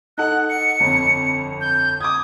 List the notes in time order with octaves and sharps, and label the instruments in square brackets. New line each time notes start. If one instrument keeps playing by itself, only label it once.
[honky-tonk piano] D#4 A4 F#5 [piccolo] F#6
[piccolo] C#7
[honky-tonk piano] G1 F2
[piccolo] G6
[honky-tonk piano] D6 G#6 [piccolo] D#6